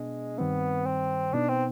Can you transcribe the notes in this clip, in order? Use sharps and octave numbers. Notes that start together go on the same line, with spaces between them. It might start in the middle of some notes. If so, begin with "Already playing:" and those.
Already playing: B2 G#3 B3 D4
G2 D#3 G3 B3 C4
C4
B2 B3 D4 D#4
C4